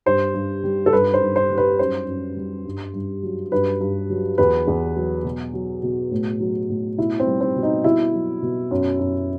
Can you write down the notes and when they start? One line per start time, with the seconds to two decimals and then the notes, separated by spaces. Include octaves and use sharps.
0.06 G2 C5
0.34 G2
0.64 G3
0.86 A4
0.93 G2 B4
1.14 C5
1.22 G2
1.36 C5
1.50 G3
1.58 B4
1.79 F#2 C5
2.07 F#2
2.37 G3
2.65 G2
2.94 G2
3.23 F#3
3.52 G2 B4
3.81 G2
4.10 F#3
4.38 E2 B4
4.67 E2
4.96 F#3
5.24 B2
5.53 F#3
5.83 B2
6.11 A2
6.40 F#3
6.69 A2
6.98 B2 E4
7.20 C4
7.27 G3
7.41 C4
7.56 B2
7.63 D#4
7.84 B2 E4
8.13 F#3
8.42 B2
8.71 F#2
8.99 F#2